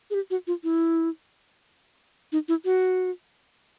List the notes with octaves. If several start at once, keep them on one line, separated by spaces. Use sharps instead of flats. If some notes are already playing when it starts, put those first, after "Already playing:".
G#4
G4
F#4
F4
E4
D#4
E4
F#4